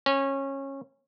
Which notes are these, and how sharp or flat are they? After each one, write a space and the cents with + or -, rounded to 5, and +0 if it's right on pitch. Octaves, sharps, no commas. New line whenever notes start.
C#4 -20